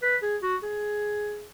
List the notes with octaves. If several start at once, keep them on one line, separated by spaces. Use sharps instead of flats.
B4
G#4
F#4
G#4